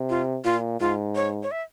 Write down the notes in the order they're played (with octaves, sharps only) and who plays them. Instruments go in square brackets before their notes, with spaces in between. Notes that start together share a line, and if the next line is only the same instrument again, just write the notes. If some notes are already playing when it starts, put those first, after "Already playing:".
Already playing: [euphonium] C3
[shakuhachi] F4
[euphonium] A#2 [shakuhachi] F4
[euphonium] G#2 [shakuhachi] F4
[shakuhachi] C#5
C#5
E5